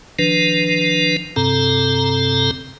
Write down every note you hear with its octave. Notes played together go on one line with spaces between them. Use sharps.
D#3 F3 D4 B4
G2 C3 C4 A4 A#5